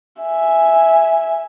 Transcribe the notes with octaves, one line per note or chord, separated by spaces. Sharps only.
E5 G#5